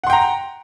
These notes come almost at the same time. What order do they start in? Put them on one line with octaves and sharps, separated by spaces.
F#5 C6 G5 A#5